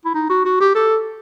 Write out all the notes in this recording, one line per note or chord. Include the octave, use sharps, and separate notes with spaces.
E4
D#4
F#4
F#4
G4
A4